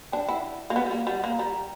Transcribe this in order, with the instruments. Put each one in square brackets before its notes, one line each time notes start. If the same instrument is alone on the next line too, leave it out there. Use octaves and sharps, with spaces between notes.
[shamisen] D4 [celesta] G5
[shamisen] E4 [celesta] F#5
[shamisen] A#3
B3
G3
A#3
[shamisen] G3 [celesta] F#5
[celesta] F#5
[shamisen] A#3 [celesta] A#5
[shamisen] G3 [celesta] A#5